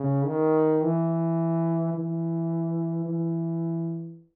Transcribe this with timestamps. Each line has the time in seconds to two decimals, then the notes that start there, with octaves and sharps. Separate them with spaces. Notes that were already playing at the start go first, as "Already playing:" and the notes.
Already playing: C#3
0.26 D#3
0.82 E3
1.94 E3
3.05 E3